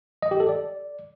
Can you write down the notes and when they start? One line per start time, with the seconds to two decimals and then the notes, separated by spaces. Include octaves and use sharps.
0.22 D#5
0.31 G4
0.40 A4
0.49 D5